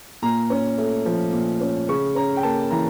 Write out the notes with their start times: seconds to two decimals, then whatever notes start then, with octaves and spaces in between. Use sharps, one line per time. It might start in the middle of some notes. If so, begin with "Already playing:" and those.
0.22 A#2 A#5
0.50 C#4
0.78 A3
1.06 F3
1.33 A#2
1.61 C#4
1.89 C#3 C#6
2.15 C#4 A#5
2.36 G5
2.43 A#3 A5
2.70 E3 A#5